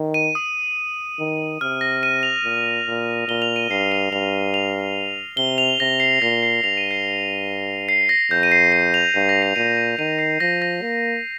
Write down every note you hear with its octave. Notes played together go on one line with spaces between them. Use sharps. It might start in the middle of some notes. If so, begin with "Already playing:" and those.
Already playing: D#3
D#7
D#6
D#3
C3 F6
A#6
D#7
F7
A#2
A#2
A#2 G7
F7
D#7
G2 C7
D#7
G2 F7
F7
C3 G7
F7
C3 A#6
C7
A#2 A#6
C7
G2 F7
D#7
C7
C7
A#6
F2 G6
D#7
C7
D#7
F7
G2
A#6
C7
A#2 D#7
D#7
D#3 D#7
C7
F3 A#6
A#6
A#3